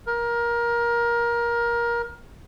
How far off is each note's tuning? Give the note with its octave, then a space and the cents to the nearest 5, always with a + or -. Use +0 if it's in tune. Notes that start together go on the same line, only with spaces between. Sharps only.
A#4 +20